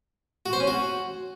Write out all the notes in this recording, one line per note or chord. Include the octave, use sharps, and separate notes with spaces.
F#4
C5
C#4
F#4